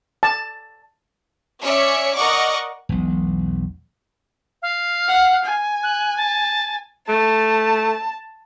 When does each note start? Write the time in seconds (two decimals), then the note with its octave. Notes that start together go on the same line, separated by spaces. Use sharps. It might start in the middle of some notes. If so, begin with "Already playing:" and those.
0.23 A5
1.62 C#4 C#5 D5 E5 C#7
2.15 A#4 D5 D#5 F#5 C#6 D6
2.89 E1 B1
4.62 F5
5.08 F#5
5.45 G#5
5.83 F#6
6.17 A5
7.09 A3 A5